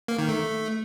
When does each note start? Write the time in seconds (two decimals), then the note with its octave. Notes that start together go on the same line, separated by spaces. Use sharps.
0.08 A#3
0.19 D#3
0.29 A3